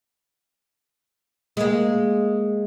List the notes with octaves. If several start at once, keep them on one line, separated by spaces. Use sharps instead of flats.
G#3 A#3